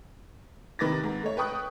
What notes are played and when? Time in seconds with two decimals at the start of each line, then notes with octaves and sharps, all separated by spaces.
0.79 C3 D#3 B4 D6 A6 A#6
1.03 G#2
1.23 A3 C#5
1.37 B4 G5 C#6 D#6 F#6